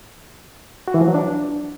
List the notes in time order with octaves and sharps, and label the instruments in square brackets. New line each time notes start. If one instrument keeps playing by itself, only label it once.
[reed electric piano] F#4
E3
F3
F#3
D4